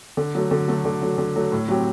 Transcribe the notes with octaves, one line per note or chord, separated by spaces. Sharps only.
D3
F#3 A3
D3
F#3 A3
D3
F#3 A3
D3
F#3 A3
A2
F#3 C4 G4